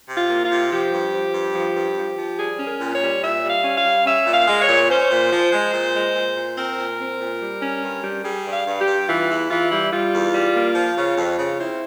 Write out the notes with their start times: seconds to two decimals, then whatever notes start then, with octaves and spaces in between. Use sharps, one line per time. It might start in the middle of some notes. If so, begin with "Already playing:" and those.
0.08 C3
0.16 F4
0.29 A#3
0.44 F4
0.50 C3
0.71 F3 G4
0.92 G2
1.13 F3
1.34 G2
1.55 F3
1.75 G2
1.97 F3
2.17 F3
2.38 G3 G#4
2.59 C#4
2.66 A#4
2.80 A#2
2.94 C#5
3.01 G3
3.22 A#2 E5
3.44 G3
3.50 F5
3.64 C#4
3.78 F5
3.85 G3
4.06 C#4 E5
4.26 A#2
4.34 F5
4.47 G#3
4.61 C#5
4.68 A#2
4.90 C#4 C5
5.11 A#2
5.31 F3
5.52 G#3
5.73 A#2
5.94 G#3
6.15 A#2
6.36 A#2
6.57 C4 A#4
6.78 A#2
6.99 C4
7.20 A#2
7.40 G3
7.62 C#4
7.83 G2
8.03 G3
8.24 G3 G#4
8.45 G2
8.53 F5
8.67 G2
8.80 G4
8.87 G2
9.08 E3 F4
9.29 E2 E4
9.50 E3 F4
9.71 G3 E4
9.92 G3 F4
10.13 E2
10.33 G3
10.54 A#3
10.75 F3
10.96 C#3
11.17 F2
11.38 C#3
11.59 C4 E4